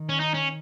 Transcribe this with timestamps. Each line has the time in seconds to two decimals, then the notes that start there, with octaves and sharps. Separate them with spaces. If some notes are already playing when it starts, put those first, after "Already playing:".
Already playing: D#3
0.09 C#4
0.20 D#4
0.34 C#4